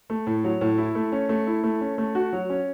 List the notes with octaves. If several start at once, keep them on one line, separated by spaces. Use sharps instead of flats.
A3
A2
F#3
A2
E4
A3
C#4
A3
E4
A3
C#4
A3
F#4
F#3
C#4